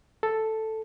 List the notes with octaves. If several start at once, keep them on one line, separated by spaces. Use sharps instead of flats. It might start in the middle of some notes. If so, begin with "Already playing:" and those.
A4